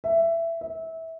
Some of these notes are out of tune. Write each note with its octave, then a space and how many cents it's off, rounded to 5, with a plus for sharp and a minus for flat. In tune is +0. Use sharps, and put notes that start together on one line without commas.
E5 +15
E5 -20